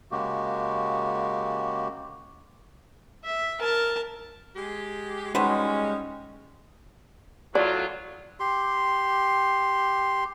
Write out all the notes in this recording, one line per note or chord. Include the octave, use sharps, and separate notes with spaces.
C#3 G#3 A#3 F#4 G4
E5
A#4 A5
G#3 G4
G3 G#3 C#4 D#4 F#4 B4 C5
A2 F#3 F4 D5
G4 C6